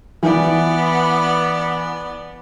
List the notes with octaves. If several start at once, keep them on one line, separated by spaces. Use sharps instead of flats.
E3 B3 D5